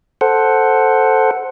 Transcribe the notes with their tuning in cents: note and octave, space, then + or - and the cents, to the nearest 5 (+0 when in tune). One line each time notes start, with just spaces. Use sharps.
A4 +0 C5 +0 F#5 +0